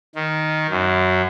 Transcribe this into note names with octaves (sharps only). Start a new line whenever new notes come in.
D#3
F#2